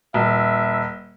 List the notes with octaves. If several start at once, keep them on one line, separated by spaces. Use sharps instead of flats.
D#1 E5